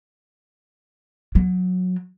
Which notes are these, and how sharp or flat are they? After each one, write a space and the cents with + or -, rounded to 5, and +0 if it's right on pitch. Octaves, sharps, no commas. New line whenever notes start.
F#3 -20